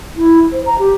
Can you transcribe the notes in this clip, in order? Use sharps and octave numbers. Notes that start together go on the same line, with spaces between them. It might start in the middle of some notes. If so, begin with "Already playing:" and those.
E4
C5
A#5
G4